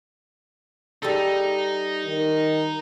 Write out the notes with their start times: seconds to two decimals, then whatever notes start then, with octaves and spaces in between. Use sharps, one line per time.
1.03 G3 D#4 A4
2.06 D#3